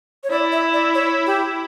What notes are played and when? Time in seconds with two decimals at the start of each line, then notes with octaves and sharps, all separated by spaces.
0.24 C#5
0.31 E4 D5
0.52 E5
0.73 D5
0.94 C#5
1.26 G4